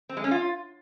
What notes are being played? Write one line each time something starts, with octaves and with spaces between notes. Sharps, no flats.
C4
G#3
C#4
F4